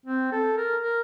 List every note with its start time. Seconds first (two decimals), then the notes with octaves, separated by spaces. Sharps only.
0.06 C4
0.32 A4
0.57 A#4
0.83 A#4